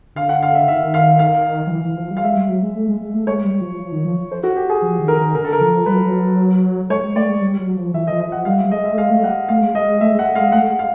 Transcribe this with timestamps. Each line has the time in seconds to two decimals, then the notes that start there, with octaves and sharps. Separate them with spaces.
0.16 D3 F5
0.29 F#5
0.43 F5
0.55 E5
0.68 D#3 E5
0.94 F5
1.19 F5
1.67 F3
1.72 E3
1.85 E3
1.97 F3
2.11 G3
2.17 F5
2.24 G#3 E5
2.36 G3
2.49 F#3
2.62 G#3
2.75 A3
2.88 G#3
3.01 G#3
3.14 A3
3.27 G#3 C#5
3.45 G3
3.61 F3
3.80 F3
3.92 D#3
4.04 F3
4.31 C5
4.43 F#4
4.56 G4
4.69 G#4
4.82 F3
4.99 D#3
5.08 A#4
5.17 D#3
5.35 D3 A#4
5.44 A4
5.53 A#4
5.60 F3
5.86 G3 B4
5.93 F#3
6.00 F3
6.07 F#3
6.89 G#3 C#5
7.03 G#3
7.16 A3 D5
7.29 G#3
7.41 G3
7.59 F#3
7.76 F3
7.94 E3 E5
8.07 D#5
8.10 F3
8.20 D#5
8.28 F3 F#5
8.45 G3 F5
8.58 E5
8.65 G3
8.71 G#3 D#5
8.85 E5
8.92 A3
8.97 G#3 F5
9.10 A3
9.23 G3 F#5
9.49 A3 F5
9.62 G#3
9.75 G3 D#5
9.88 G#3
10.01 A3 E5
10.14 G#3
10.19 F#5
10.26 A3
10.35 F5
10.40 G#3
10.52 A3 F#5
10.70 G#3
10.79 F5